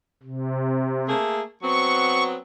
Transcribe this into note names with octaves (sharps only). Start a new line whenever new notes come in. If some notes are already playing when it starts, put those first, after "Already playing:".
C3
A3 A#3 G#4
F#3 B3 C4 C#6